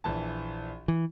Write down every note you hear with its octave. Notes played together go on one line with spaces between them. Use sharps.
A#1 E3 A5
E3